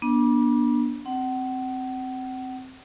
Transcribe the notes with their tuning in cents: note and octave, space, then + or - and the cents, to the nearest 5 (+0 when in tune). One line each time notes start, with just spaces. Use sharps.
B3 -40 D4 +0
C4 +0 F#5 +35